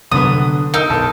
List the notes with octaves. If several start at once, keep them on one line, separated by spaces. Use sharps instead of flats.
C2 D3 F#3 B3 D#6
D#4 A#4 E6
B1 A#4 A5